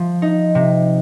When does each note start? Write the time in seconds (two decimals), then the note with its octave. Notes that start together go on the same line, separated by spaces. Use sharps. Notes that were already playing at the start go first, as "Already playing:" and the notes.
Already playing: F3
0.22 D#4
0.55 C3